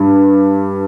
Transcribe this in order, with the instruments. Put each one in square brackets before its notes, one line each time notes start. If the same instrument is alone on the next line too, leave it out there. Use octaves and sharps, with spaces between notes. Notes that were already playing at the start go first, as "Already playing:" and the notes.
Already playing: [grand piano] G2